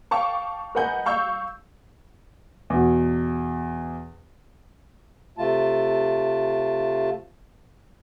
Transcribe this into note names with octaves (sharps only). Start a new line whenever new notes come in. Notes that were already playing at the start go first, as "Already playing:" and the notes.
F5 G5 A5 C#6 D6
A#4 B4 D#5 F#5 G#5 G6
F5 C#6 E6 G6
E2 B2
C3 A3 F4 A5